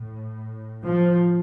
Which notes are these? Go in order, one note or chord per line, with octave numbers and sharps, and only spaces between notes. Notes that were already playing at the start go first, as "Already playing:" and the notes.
Already playing: A2
F3